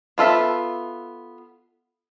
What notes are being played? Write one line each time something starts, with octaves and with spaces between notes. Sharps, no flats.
B3 F4 A4 E5